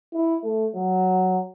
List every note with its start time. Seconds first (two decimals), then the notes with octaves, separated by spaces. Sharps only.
0.13 E4
0.44 A3
0.75 F#3